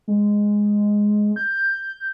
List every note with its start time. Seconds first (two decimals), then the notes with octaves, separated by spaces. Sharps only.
0.08 G#3
1.36 G6